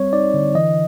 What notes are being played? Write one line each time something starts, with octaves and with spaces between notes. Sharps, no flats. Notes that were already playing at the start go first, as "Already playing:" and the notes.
Already playing: G3 C4 C#5
D#4 D5
D3
E3 D#5